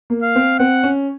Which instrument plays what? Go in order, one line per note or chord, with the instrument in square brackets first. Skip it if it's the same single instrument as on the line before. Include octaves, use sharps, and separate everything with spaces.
[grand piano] A#3
[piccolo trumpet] F5
[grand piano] C4
[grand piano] C4 [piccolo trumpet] F#5
[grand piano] C#4